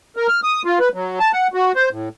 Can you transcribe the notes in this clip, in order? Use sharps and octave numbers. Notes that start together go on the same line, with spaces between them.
A#4
F6
D#6
F4
B4
F#3
A5
F#5
F#4
C5
A2